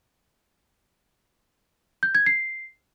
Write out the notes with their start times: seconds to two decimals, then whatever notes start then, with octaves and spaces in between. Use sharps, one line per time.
2.03 G6
2.15 G#6
2.26 C7